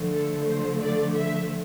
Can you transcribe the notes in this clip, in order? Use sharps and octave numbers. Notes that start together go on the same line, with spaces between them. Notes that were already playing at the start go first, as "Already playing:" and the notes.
Already playing: D3 F3 A3
A4
C5
D5
E5